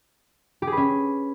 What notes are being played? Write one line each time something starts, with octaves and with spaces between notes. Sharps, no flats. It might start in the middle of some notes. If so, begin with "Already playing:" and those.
G4
G#4
B4
C#4